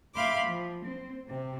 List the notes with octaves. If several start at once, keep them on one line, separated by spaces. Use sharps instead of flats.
E5 F5 G5 B5 C6 D6
F3
C4
C3 C4